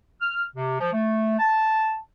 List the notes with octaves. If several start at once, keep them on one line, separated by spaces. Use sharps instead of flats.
F6
C3
F3
A3
A5